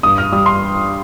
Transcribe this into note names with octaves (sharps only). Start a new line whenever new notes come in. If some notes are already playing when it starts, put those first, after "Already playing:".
G2 D#6
F6
G3 D#6
C6